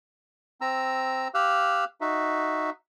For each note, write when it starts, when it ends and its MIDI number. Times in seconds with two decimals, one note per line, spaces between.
0.61 1.28 60
0.61 1.28 82
0.61 1.28 88
1.34 1.85 67
1.34 1.85 77
1.34 1.85 88
1.34 1.85 90
2.01 2.70 63
2.01 2.70 66
2.01 2.70 76